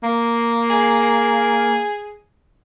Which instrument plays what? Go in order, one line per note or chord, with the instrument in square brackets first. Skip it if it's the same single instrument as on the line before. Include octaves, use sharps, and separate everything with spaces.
[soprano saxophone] A#3
[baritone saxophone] G#4